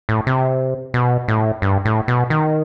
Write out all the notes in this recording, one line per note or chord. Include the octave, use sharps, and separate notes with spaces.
A2
C3
B2
A2
G2
A2
B2
D#3